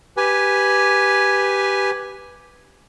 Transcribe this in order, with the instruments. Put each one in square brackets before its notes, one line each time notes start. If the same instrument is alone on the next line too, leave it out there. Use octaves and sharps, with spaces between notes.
[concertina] G4 B4 G#5